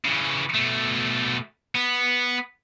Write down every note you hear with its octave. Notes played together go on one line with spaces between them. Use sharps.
C#3 E3
B2 A3
B3